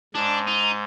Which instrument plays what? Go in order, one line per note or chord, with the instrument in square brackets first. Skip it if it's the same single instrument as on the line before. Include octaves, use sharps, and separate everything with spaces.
[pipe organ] G#2 [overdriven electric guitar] D4
[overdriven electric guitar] D#4